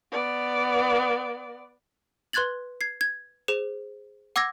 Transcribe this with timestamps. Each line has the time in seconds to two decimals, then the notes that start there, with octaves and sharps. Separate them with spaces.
0.12 B3 D5
2.33 B4 C6 F#6 G#6 A6 F#7
2.81 G#6 C7
3.01 G#6
3.48 G#4 C5 E7
4.36 F#5 D6 E6 G#6 A#6